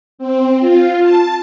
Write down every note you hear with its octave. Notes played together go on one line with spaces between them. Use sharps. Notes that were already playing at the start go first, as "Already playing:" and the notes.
C4
F4
A5